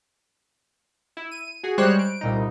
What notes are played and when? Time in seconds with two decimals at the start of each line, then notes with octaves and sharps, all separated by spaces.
1.17 E4
1.31 D#7
1.63 F#4 G#4
1.78 G3 G#3 C5 C#5 F#6
1.99 D7
2.21 C2 A#2 D#4